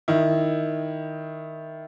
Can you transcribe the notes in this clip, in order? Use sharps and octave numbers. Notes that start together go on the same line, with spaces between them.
D#3 E4